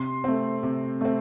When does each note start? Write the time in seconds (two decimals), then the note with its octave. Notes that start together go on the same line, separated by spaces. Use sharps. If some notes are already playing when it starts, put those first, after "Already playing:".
Already playing: C3 C6
0.24 A3 C4
0.63 C3
1.01 A3 C4